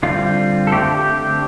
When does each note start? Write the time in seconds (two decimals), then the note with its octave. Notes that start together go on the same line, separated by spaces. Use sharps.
0.03 D3 G3 C4 F4
0.67 A4
0.71 D3 A3 C4 G4
0.94 G4
1.17 G4